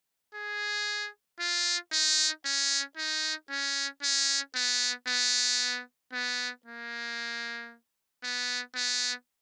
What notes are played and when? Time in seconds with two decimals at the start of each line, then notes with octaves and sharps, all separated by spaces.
0.35 G#4
1.40 F4
1.92 D#4
2.45 C#4
2.97 D#4
3.50 C#4
4.03 C#4
4.55 B3
5.08 B3
6.13 B3
6.66 A#3
8.24 B3
8.75 B3